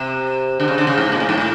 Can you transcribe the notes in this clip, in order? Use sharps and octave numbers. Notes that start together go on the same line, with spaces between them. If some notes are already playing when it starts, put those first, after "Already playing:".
Already playing: C3
D3
C#3
D3
C#3
G#2
A#2
A2
G#2
A2